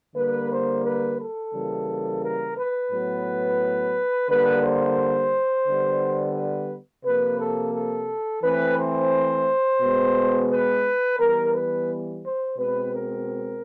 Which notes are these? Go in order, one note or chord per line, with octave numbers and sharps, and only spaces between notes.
D3 G3 A#3 B4
C5
B4
A4
C#3 E3 G3 A#3
A#4
B4
A2 F#3 B3
D3 G3 A#3 B4
C5
D3 G3 B3
B4
C3 F3 A#3 B4
A4
A4
E3 A3 C4 B4
C5
B2 G#3 B3
B4
E3 G3 B3 A#4
B4
C5
B2 G#3 C4 B4
A#4